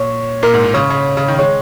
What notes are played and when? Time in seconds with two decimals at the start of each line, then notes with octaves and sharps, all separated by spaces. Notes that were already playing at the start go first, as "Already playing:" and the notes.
Already playing: A#2 C#5
0.43 A#2 A#4
0.54 G#2
0.64 A#2
0.74 C#3 C#5
0.90 C#3
1.17 C#3
1.28 D#3
1.39 G#3 C#5